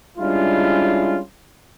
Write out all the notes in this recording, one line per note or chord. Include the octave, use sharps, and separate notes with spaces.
G3 G#3 C#4 D4 E4 F4